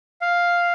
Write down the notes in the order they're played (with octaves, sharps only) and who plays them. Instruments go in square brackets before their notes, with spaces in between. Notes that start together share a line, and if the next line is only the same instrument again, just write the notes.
[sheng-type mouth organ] F5